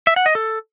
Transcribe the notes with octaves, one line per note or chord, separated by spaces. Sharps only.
E5
F#5
D#5
A4